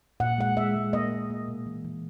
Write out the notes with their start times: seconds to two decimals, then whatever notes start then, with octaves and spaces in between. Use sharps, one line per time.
0.20 A#2 F#5
0.38 G#3 F#5
0.57 G#3 E5
0.76 G#3
0.93 A#3 D#5
1.12 A#3
1.30 A#3
1.48 B2
1.66 E3
1.85 E3